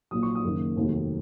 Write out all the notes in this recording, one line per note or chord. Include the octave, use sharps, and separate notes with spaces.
A#1 A#2 F#3 D#6
C#6
D#6
F#1 F#2 D#3 A#3
F1 D#2 D#3 F#3